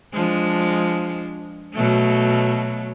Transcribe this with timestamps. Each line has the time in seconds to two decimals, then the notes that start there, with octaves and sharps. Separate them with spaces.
0.13 F3 G#3 D4
1.73 B2 F#3 A3